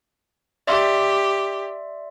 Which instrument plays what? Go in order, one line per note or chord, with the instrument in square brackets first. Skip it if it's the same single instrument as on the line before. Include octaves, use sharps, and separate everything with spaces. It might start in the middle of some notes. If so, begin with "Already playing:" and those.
[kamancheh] G4 [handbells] D5 E5 C6